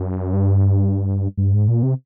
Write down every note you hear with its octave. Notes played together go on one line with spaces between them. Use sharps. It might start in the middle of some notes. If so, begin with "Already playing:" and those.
Already playing: F#2
G2
G2
G#2
A#2
C3